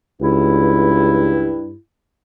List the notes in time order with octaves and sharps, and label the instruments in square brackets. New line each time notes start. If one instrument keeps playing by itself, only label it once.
[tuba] C#2 [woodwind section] G2 E4